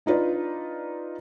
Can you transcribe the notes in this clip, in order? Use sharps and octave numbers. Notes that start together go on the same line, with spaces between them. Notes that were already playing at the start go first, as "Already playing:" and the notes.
D4 D#4 F4 B4 D5